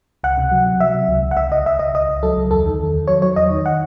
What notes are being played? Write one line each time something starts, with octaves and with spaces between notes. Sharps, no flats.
C#2 F#5
C3
F#3
C3
F#3 E5
C3
C#2
C#2
F#5
C#2 E5
C#2 D#5
C#2 E5
C#2 D#5
C#2 D#5
C#2
F#3 A4
C#2
E2 A4
D#3
E2
D#3
F#3 C#5
F#3 C#5
E2 D#5
D#3
F#5